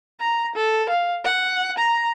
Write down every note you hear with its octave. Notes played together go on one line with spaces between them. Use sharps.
A#5
A4
F5
F#5
A#5